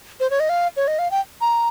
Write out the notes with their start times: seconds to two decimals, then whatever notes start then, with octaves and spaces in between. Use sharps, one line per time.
0.20 C5
0.30 C#5
0.40 D#5
0.49 F5
0.77 C#5
0.88 D#5
0.99 F5
1.11 G5
1.41 A#5